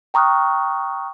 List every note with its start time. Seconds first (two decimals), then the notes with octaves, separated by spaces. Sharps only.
0.14 G5 A#5 C#6 D#6 F6 F#6